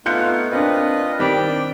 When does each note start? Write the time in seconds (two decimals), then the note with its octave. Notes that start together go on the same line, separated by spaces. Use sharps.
0.06 A3 B3 D#4 F4 F#6 G6 C#7
0.51 A#2 C4 D4 F4 B4 D#5
1.19 D#3 G3 C4 G5 B6
1.47 D4